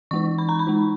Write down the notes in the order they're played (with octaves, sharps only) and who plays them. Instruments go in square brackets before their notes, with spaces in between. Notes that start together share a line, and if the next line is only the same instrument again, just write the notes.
[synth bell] E3 G#3 D#4 C#6
B5
A#5
B5
G#3 D#4